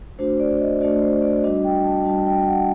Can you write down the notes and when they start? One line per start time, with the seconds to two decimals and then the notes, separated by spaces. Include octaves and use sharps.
0.19 A3 D4 F#4 C5
0.40 D5
0.61 D#5
0.81 A3 D4 F#4 D5
1.02 C5
1.22 D5
1.43 G3 D4 F#4 D#5
1.64 G5
1.84 A5
2.05 G3 D4 F#4 A5
2.27 G5
2.47 F#5